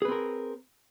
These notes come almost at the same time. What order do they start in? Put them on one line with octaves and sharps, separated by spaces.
G#4 B4 C4 A#4